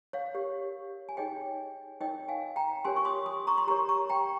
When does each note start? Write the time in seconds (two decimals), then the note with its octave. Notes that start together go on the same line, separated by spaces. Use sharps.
0.13 C#5 F5
0.34 G4 A#4 C#5
1.09 G#5
1.17 D#4 G#4 C#5 D#5 G5
2.01 D#4 A#4 C#5 D#5 G5
2.28 F5 G#5
2.56 G5 A#5
2.85 C#4 G4 A#4 C#5 G#5 C6
2.96 C#6
3.05 C6 D#6
3.26 C6 D#6
3.47 A#5 C#6
3.58 C6
3.67 G4 A#4 C#5 A#5 C#6
3.89 A#5 C#6
4.09 G5 A#5